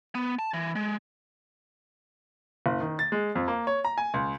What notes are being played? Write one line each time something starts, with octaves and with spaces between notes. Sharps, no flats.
B3
A5
E3
G#3
F#1
D#3
A6
G#3
F2
A#3
C#5
A#5
G#5
C#2